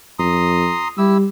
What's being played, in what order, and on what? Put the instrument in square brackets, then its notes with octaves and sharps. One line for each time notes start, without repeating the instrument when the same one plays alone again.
[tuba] F2 [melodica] A#5 C6 D#6
[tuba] G3 [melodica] E4 G4 E6